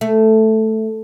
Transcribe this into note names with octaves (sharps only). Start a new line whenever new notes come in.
A3